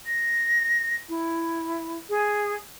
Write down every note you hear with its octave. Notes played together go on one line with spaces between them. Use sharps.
A#6
E4
G#4